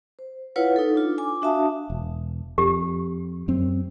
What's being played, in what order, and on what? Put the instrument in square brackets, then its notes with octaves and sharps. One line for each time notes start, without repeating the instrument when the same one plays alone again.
[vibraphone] C5
E4 F4 B4 C#5 F5 F#5
D#4 A4
D4 F4
G#5 D6
D4 F#4 E5 F5 A5 D#6
[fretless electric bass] E1
[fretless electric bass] F2 [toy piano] G4
[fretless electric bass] F#2 C4